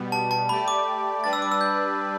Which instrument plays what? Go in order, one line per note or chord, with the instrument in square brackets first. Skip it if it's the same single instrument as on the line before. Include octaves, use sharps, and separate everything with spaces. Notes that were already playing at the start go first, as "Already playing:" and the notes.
Already playing: [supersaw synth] B2 G3 B3
[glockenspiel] A5
A5
[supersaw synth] A3 G4 D5 [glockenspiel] B5
[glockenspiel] D6
[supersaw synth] G3 D4 B4 D5 [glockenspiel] A6
[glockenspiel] E6
D6
E6
G6